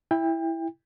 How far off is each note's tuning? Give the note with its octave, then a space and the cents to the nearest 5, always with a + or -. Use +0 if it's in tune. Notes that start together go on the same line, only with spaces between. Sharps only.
E4 +0 G5 +30